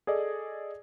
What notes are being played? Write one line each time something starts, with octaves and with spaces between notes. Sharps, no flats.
G#4 A4 D5 D#5